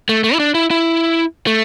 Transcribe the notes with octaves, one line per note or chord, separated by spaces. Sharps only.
A3
A3
E4
D4
E4
E4
A3